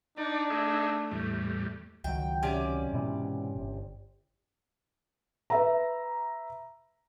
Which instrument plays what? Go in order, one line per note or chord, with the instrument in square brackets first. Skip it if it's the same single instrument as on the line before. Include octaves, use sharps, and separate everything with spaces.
[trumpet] D4 [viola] D#4 [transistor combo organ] D5
[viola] A3 [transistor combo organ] D#4 G#4 E5
[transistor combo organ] E2 A2 G3
[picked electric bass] C#2 D#3 F#3 [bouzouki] G5
[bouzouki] C3 C#4 D5
[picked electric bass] G#2 B2 E3
G1
[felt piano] B4 E5 A#5